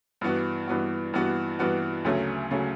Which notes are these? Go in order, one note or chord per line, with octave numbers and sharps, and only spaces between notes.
G2 E3 B3 F#4
G2 E3 B3 F#4
G2 E3 B3 F#4
G2 E3 B3 F#4
D2 C#3 F#3 A3 C#4
C#3 F#3 A3 C#4